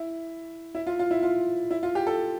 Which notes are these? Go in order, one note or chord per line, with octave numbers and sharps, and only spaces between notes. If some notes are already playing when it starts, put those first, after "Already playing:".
Already playing: E4
E4
F4
F4
E4
F4
E4
F4
G4
A4